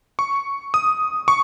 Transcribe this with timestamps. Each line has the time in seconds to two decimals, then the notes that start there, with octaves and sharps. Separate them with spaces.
0.19 C#6
0.74 D#6
1.28 C#6